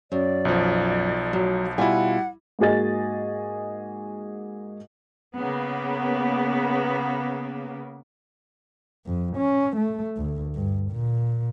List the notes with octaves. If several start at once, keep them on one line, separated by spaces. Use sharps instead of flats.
F#2 D5
B1 F3
F#3
B2 G3 E4 F4 F#5 G#5
G#2 A#3 F#4 G#4 D#5 A6
C#3 A#3 B3
F2
C#4
A3
D2
G2
A#2